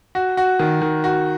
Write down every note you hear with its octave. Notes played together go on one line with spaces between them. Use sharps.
F#4
F#4
D#3
D#3
F#4